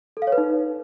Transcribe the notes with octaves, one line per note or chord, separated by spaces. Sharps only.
A4
F5
C#5
B4
D#4